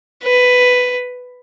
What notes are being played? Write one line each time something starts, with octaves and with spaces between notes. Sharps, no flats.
B4